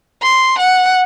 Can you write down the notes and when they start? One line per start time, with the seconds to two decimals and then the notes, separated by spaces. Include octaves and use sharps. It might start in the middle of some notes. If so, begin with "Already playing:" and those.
0.22 C6
0.59 F#5